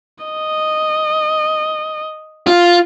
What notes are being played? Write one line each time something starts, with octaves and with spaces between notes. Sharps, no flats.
D#5
F4